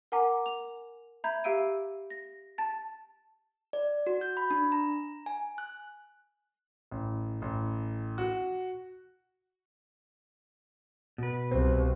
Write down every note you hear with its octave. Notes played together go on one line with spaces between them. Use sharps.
A#4 F#5 G#5 A#5 D6
F7
E5 A#5 B5 G6 G#6
G4 E5 F5 E6 D7 D#7
A#6
A5 A6
D5
F#4
G6
B5
D4
A#5
G#5
F#6
A1
A1
F#4
B2 B4
C2 C4